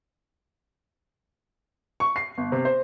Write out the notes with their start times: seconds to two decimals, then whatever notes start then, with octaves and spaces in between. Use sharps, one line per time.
2.00 C#6
2.16 C7
2.38 G1
2.52 C3
2.65 C5